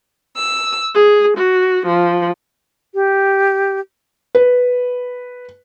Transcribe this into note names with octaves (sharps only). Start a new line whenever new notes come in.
E6
G#4
F#4
F3
G4
B4